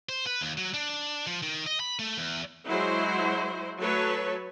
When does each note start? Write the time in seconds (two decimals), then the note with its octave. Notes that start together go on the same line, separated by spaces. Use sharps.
0.09 C5
0.26 B4
0.41 D#2
0.57 F#3
0.74 D4
1.27 F3
1.42 D#3
1.67 D#5
1.80 B5
1.99 A3
2.18 E2
2.69 F#3 G#3 E4 F#4 C5
3.80 F#3 A3 B4 C#5 A5